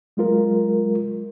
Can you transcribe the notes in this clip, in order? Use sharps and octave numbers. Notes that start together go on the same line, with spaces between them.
F#3 G#3 F4 A#4